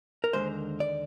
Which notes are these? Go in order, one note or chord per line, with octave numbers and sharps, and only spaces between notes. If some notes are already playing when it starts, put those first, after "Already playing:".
A#4
D#2 D3 F3 G#3 C5
D5